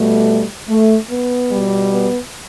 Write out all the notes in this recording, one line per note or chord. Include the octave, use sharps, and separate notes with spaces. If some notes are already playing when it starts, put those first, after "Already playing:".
Already playing: B2 G3 A3
A3
B3
B2 G3
B3